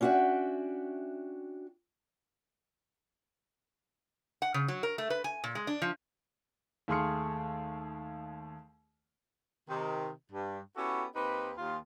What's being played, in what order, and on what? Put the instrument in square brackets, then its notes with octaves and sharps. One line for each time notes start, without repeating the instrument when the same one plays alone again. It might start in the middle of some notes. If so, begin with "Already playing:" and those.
[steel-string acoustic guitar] C#4 D4 F#4 D#5 E5 G5
[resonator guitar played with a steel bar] F#5
C#3
F#3
A#4
A3
B4
G#5
A#2
G#3
D4
F3
[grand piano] D#2 A3 G#4 C6 F6 C#7
[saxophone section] C3 D#3
G2
B3 C#4 E4 F#4 G4 A4
D#2 C4 D#4 G4 B4
D#2 F4